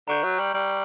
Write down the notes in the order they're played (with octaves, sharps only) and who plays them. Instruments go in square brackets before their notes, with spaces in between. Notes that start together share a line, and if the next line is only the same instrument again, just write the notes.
[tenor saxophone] D3 [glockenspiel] A#5 C#6 G6
[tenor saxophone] F#3
G3
G3